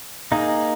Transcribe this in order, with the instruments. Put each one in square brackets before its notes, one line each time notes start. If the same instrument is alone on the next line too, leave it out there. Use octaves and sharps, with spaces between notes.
[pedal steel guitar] A#3 D#4 G#4